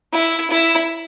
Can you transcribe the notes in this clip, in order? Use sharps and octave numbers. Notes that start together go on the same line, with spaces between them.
E4
E4